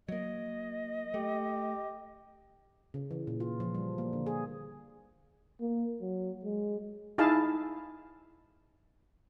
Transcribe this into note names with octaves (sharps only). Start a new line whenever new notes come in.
F#3 A#3 D#5
A3 G4
C#3
E3
A#2
F4
F3
G3
A#3
D3
G#4
A#3
F#3
G#3
D#4 E4 G#4 F5 A5